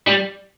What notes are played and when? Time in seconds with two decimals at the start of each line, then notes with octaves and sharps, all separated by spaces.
0.07 G3